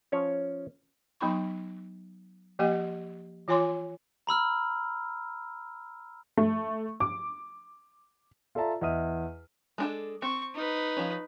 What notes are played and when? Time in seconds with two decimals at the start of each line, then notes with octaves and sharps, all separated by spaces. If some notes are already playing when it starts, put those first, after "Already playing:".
0.12 F3 C#4 C#5
1.20 F#3 B3 D#4 B5 C#6
2.59 F3 A#3 G4 D#5 F#5
3.48 E3 F4 C#5 G#5 C6 D6
4.27 A#5 B5 E6 F6
6.37 A3
7.00 D6
8.55 F4 A4 D5 E5 A5 A#5
8.81 E2 D#5 E5 D#6 F6 D#7
9.78 G#3 D4 A4
10.22 C4 C#6
10.55 D#4 B4
10.97 F3 C#4